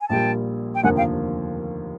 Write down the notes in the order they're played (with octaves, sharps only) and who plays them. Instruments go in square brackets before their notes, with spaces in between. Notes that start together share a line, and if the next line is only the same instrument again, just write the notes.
[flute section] G#5
[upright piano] A#1 A#2 G3 [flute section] G5 A5
[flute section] G5
[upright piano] F1 D#2 D3 F3 A#3 [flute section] F#5 G#5
[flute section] F5 G5